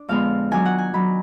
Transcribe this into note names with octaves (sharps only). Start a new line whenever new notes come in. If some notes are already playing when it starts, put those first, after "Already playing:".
Already playing: D4
F2 D3 G#3 B3 F5
D#3 F#3 D4 G#5
F#5
G#5
D#3 F#3 D4 B5